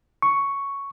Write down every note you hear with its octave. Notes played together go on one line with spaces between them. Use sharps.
C#6